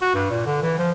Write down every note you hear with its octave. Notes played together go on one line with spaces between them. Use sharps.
F#4
G2
A#2
D3
E3
F3